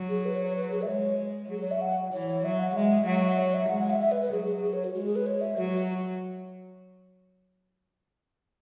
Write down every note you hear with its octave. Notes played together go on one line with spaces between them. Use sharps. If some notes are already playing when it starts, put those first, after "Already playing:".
Already playing: F#3
G#4
B4
C#5
C#5
B4
G#4
E5
G#3 C#5
F#3 G#4
C#5
E5
F#5
E3 C#5
C#5
F#3 E5
F#5
G#3 E5
F#3 F#5
E5
C#5
E5
G#3 F#5
F#5
E5
E5
B4
B4
F#3 G#4
G#4
G#4
C#5
F#4
G#3 F#4
G#4
B4
C#5
E5
F#3 F#4
F#4